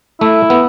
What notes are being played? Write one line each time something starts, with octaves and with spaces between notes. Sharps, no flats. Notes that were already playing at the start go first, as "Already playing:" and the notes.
A3 E4
B3